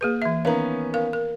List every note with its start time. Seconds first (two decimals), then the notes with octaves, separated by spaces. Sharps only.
0.01 A#3 G#4 B4
0.22 E3 E5
0.45 D#3 B3 C#4 F5 A#5
0.94 A#4 F5
1.13 A#4